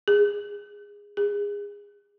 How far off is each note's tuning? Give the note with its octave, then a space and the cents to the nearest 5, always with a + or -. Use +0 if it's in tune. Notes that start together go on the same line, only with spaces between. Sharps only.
G#4 -15
G#4 -25